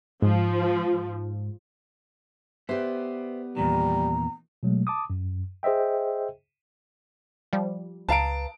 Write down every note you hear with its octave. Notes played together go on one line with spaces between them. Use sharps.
G#2 F3
B3 G4 B4 C5 D5 E5
E2 A#2 D#3 G3 A#5
B2 F#3 G#3 A3
A5 D6 D#6
F#2
G#4 C5 D#5 E5 G5
F3 G3
C#2 B4 F5 A5 A#5 D7